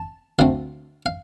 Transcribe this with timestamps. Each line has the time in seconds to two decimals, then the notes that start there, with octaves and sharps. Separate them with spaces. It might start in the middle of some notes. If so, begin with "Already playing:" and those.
Already playing: A5
0.39 D2 D3 A3 C4 F5
1.06 F5